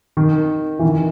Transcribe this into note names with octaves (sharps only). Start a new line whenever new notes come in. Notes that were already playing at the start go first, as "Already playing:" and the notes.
D#3
E3
D#3